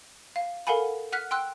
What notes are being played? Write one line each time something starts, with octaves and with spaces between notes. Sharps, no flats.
F5
A4 A#4 F5 F#5 G#5 B5
F#5 F6 F#6 B6
G5 C6 E6 F#6